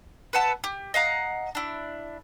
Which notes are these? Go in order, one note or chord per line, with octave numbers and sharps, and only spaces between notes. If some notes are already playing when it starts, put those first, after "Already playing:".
B4 E5 F#5 A5
G4
D#5 F5 F#5 A#5
D4 E4